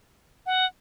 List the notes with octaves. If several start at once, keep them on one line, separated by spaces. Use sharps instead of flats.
F#5